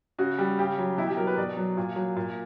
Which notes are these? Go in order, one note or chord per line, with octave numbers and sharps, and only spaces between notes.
C#3 F#4
G3
C#3 G4
F#3
B2 E4
G4
F#3 A#4
B4
B2 D5
F#3
A#2
F#3
A#2